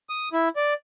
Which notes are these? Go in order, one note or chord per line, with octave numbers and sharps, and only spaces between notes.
D#6
E4
D5